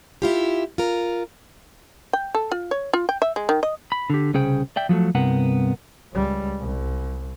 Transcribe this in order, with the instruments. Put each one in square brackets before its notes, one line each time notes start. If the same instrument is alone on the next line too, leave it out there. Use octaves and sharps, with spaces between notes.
[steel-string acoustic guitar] E4 F4 G4
F4 A#4
[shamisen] G5
A4
F4
C#5
F4
G5
E5
G#3
D#3
D#5
[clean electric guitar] B5
D3 G4
C2 C#3 C#4 G#4 C5 G5
D5 E5 G5
F3 F#3 G#3 A3
C2 G2 C3 B3 A#4 F#5
[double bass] C#2 G3
C2